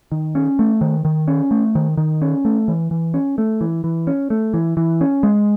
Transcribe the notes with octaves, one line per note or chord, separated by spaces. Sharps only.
D#3
C#4
A3
D#3
D#3
C#4
A3
D#3
D#3
C#4
A3
E3
E3
C#4
A3
E3
E3
C#4
A3
E3
E3
C#4
G#3